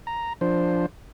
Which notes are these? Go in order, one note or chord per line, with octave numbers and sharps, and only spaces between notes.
A#5
F3 D4 C5